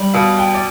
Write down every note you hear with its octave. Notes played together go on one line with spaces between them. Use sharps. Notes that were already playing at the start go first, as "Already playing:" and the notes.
Already playing: G3
B2 F5
G5
D5